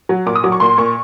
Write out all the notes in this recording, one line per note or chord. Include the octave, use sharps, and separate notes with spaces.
F#3
A#2 D6
D#6
F#3 D6
C#6
A#2 C6
A#2 C#6